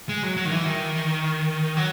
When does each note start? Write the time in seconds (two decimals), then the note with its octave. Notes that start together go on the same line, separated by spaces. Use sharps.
0.09 G#3
0.23 F#3
0.37 F#3
0.45 D#3
0.51 E3
0.65 D#3
1.77 F#3